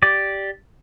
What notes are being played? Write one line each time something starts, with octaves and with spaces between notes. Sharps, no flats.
G4 D5